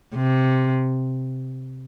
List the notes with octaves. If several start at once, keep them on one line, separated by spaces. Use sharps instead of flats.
C3